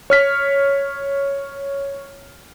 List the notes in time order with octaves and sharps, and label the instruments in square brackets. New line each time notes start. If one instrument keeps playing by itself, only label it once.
[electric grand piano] C#5 F6 B6